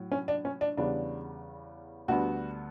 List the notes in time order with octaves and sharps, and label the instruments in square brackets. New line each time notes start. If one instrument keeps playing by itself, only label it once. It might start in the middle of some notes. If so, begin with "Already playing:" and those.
Already playing: [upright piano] A2 F#3
C#4
D4
C#4
D4
E2 C#3 G3 B3 D4
D2 D3 G3 B3 F#4